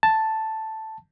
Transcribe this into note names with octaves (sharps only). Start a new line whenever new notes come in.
A5